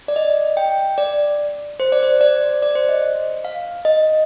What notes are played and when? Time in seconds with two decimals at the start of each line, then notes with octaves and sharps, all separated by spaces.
0.08 D5
0.16 D#5
0.57 G5
0.98 D5
1.80 C5
1.92 D5
2.03 C5
2.21 D5
2.62 D5
2.75 C5
2.89 D#5
3.45 F5
3.85 D#5